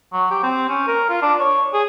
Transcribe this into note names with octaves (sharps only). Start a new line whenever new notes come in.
F#3
G4
C4
C#4
A#4
F4
D4
C#5
G#4